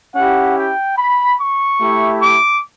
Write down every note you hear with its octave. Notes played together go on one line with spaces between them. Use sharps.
C#4 E4 G4 F#5
G5
B5
C#6
A3 E4 G4
D6